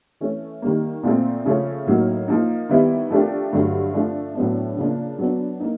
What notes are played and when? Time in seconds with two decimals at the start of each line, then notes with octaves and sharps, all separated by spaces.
0.21 E3 A3 C#4
0.62 D#3 G3 A#3
1.03 A#2 F3 A3 C4
1.45 C#3 F3 A3 C#4
1.86 A2 F#3 A#3 D#4
2.28 F3 A#3 D#4
2.69 D#3 G3 B3 E4
3.10 F3 A3 D4 G4 A#4
3.53 G2 D3 F#3 A3
3.94 F3 A3 D4
4.35 A2 F#3 B3 D4
4.77 C#3 F3 A#3 D4
5.19 F#3 B3 D4
5.60 A#3 D#4